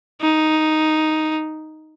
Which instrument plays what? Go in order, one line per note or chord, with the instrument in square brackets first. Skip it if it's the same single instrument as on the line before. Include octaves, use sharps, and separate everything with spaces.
[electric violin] D#4